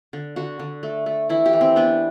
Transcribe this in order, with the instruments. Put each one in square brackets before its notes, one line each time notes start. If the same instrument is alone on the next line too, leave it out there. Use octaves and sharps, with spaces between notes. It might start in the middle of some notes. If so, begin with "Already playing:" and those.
[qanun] D3
D3 F#4
D3
A3
A3
E3 E4
G4
E3
C4
B3 D4